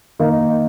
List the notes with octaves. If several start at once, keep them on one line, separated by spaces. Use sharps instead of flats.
D#3 A#3 D#4